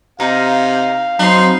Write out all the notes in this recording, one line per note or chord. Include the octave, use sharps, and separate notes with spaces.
C3 D#4 F5
F#3 C4 D#4 B5 C6